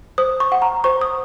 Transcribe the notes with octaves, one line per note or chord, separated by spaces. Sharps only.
C5 D#6
C#6
F#5
A#5
C5 C#6
D#6